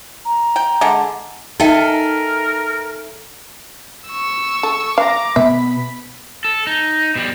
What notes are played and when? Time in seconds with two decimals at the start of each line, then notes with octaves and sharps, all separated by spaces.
0.25 A#5
0.56 G5
0.81 D3 G#3
1.60 D#4 A4 A#4 D#5 E5 G5 G#5
4.09 C#6 E6
4.63 A4
4.98 F5 A#5 D6
5.36 B2 B3 E5 B5
6.45 A4
6.67 D#4
7.16 B2 G3